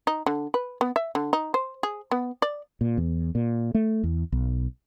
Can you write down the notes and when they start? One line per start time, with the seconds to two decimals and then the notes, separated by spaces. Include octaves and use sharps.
0.07 D#4
0.26 D3
0.54 B4
0.81 B3
0.96 E5
1.15 D3
1.33 D#4
1.54 C5
1.83 G#4
2.11 B3
2.42 D5
2.81 A#2
2.98 E2
3.35 A#2
3.74 A3
4.03 E2
4.32 B1